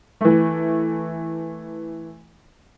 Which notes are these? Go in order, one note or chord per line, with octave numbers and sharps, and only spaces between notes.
E3 A3